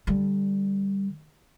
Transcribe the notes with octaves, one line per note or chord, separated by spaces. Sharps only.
D3 G3